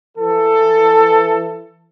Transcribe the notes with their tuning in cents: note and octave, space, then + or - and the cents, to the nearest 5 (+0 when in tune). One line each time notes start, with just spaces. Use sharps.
E3 +25 A4 +15